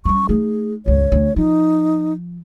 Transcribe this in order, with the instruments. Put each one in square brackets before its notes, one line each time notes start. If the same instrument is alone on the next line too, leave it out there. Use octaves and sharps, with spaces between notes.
[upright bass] G3 C#4 [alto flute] C#6
[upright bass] A3 D#4 [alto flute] G#4
[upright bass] G1 C#2 [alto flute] C#5
[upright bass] D2
[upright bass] F3 [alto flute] D#4